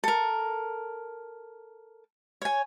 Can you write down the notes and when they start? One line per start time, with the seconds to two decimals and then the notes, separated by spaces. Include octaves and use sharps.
0.04 A4 A#4
2.42 C#5 G#5